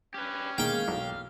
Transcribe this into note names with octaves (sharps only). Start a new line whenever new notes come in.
C#4 G4 B4
D#3 G#3 A#3 F5 G5
B1